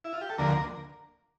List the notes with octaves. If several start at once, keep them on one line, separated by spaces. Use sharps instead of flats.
E4
F4
G4
A4
D2 D3 F3 A#3 A#4